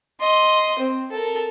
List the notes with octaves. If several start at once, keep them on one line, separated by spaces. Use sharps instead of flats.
D#5 C6
C4
A4 A#4